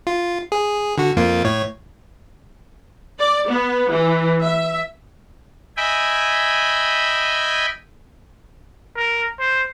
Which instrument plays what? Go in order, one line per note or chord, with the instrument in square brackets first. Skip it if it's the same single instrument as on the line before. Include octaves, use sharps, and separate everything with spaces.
[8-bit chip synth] F4
G#4
D3 F#4
F2 A#3 F4
A2 C#5
[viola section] D5
B3
E3
E5
[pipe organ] D#5 E5 G5 G#5 B5
[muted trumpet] A#4
C5